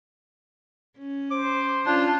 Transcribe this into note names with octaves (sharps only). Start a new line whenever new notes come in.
C#4
C5 D6
C#4 D4 F4